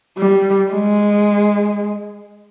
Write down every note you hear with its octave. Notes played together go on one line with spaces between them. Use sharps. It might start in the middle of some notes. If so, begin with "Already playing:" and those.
G3
G#3